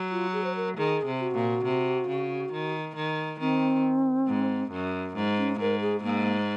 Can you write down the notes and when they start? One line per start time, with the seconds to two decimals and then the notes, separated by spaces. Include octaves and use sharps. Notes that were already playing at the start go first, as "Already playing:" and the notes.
Already playing: F#3
0.11 F4
0.33 G#4
0.44 C5
0.56 A#4
0.77 D#3 G#4
1.06 C3
1.20 F#4
1.35 A#2
1.65 C3
2.08 C#3
2.53 D#3
2.96 D#3
3.40 D#3 C4
4.28 G#2
4.71 F#2
5.16 G#2
5.38 C#4
5.60 G#2 A#4
5.81 G#4
6.03 G#2 A#3